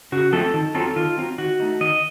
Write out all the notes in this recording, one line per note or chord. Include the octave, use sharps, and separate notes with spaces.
C#3 F#4
F3 A3 C4 A4
D#3
F#3 C4 F4 A4
D#3 F4
F#3 C4 F4
D#3 F#4
A3 D#4
D#3 D#5